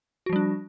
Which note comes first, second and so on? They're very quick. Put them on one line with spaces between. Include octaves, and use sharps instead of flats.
F#4 F3 G3 D4